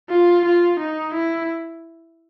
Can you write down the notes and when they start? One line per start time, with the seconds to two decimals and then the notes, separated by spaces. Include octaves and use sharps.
0.10 F4
0.45 F4
0.79 D#4
1.14 E4